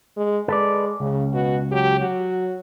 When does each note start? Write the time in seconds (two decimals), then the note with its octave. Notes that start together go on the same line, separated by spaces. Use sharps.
0.17 G#3
0.48 G#3 A4 B4 D5
1.00 C#2 C#3
1.33 B2 F#4
1.71 F#3 G4
2.01 F#3 F#4